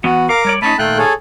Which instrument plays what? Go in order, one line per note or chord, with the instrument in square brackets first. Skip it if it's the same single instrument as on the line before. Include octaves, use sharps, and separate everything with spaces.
[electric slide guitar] E3 B3 [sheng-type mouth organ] F#4
[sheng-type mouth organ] A#4 D6 [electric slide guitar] F5
[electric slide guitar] G3 C#5 D5
[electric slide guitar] A3 C#4 D#4 [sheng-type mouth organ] A5 B5
[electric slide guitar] A#2 D#3 F4 [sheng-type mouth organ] A3 G5 F#6
[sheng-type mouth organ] G#4 A4 C#5